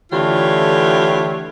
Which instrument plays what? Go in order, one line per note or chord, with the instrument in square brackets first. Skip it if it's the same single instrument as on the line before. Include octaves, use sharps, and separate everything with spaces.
[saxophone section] D3 E3 A3 F4 G4 C#5